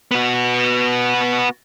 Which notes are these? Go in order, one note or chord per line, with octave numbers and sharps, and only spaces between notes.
B3 F#4